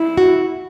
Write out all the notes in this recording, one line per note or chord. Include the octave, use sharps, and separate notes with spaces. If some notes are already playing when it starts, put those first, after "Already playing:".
Already playing: E4
F#4